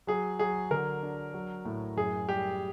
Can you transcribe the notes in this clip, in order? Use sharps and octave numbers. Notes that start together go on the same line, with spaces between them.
F#3 G#4
F#3 G#4
D3 A#4
D4
F#3
A2
F#2 G#4
G3 G4